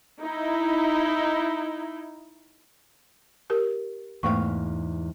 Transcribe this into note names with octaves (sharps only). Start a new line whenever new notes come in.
D#4 E4
G4 A#4
E2 G#2 A3 A#3 F5 C#6